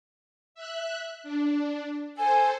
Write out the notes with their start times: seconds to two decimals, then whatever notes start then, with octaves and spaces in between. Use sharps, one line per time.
0.55 E5 F#6
1.23 D4
2.15 A4 C5 G#5